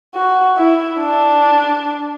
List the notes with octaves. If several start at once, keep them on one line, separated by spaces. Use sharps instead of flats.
F#4
E4
D4